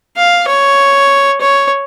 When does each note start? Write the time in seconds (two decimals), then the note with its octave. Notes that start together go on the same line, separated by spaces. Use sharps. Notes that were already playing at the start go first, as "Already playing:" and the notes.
0.17 F5
0.48 C#5
1.41 C#5